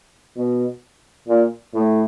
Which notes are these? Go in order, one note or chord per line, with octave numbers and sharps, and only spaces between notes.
B2
A#2
A2